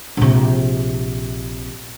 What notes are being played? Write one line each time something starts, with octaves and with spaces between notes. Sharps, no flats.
A#1 C3